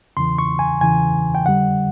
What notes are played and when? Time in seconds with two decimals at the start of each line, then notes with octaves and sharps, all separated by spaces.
0.17 E2 C#3 E3 C6
0.39 C#6
0.59 G#5
0.81 E2 C#3 E3 G#5
1.35 G5
1.46 F2 D3 G3 F#5